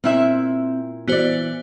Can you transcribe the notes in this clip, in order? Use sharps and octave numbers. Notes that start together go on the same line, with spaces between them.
A#2 C4 E4 E5
E3 B3 F#4 C5 D5